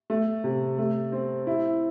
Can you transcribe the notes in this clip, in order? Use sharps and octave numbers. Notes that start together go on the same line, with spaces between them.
A3
C3
A3
C4
E4